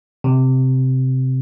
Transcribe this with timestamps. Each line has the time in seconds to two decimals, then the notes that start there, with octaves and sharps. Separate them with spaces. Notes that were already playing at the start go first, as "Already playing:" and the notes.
0.24 C3